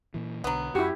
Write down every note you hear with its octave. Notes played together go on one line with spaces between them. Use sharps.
A#2 E3
B1 D3 F#3 B3
F#2 E4 F#4 G4